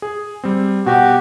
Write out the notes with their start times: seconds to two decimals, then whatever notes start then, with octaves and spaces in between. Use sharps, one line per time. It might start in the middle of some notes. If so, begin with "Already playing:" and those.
0.02 G#4
0.44 G3 C4
0.86 B2 F#4 G4